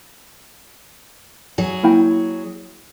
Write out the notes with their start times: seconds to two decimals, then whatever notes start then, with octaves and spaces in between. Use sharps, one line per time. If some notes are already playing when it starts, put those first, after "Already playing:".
1.58 F#3 G#4
1.83 A#3 E4 G5